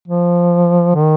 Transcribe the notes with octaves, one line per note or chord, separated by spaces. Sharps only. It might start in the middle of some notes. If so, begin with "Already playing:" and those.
F3
D#3